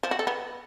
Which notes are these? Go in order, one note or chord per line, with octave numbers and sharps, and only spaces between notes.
F3
F#4
A4
B3